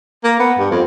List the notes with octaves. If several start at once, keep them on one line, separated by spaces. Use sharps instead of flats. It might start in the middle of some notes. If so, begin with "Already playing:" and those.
A#3
B3
G2
F2